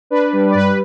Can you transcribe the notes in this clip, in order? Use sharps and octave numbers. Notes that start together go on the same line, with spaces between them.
D4 B4
G3
D5
G2 B4